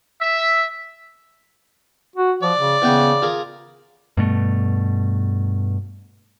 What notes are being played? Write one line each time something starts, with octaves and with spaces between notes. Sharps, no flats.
E5
F#4
F3 D5
C#3
C#3 E3 B3 G5
F4 G#4 A#4
G2 B2 A3